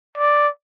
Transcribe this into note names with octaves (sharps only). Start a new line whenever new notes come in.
D5